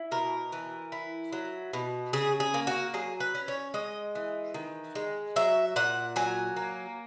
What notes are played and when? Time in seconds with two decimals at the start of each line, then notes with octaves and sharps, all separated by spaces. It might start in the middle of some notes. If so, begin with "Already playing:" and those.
Already playing: E4
0.11 B2 A#4
0.52 E3
0.92 E4
1.32 F#3
1.73 B2
2.13 C#3 G#4
2.40 G#4
2.54 A#3
2.67 F#4
2.94 F#3 G#4
3.20 B4
3.35 C#4
3.48 C#5
3.74 G#3 D#5
4.15 E3
4.54 D#3
4.95 G#3
5.36 F#3 E5
5.76 A#2 F#5
6.16 F#3 G#5
6.57 A#3